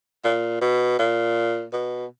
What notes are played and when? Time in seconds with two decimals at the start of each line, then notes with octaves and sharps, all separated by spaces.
0.24 A#2
0.61 B2
0.99 A#2
1.73 B2